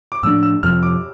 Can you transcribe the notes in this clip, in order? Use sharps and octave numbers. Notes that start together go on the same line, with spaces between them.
D6
A2 F3 A3 D4 E6
E6
F2 C3 F3 F6
D6